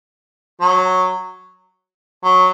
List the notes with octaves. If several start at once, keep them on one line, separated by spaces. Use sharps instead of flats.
F#3
F#3